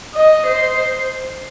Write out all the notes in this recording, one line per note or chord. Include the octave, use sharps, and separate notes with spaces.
D#5
C5